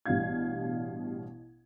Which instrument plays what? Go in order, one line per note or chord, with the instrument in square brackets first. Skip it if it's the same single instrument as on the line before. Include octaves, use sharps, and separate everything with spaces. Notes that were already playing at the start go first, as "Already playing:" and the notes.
[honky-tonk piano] A1 B2 G3 D4 F5 G#6